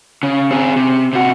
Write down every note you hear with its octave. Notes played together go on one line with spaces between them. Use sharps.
C#3
C4 G#4
C3
C3 F#4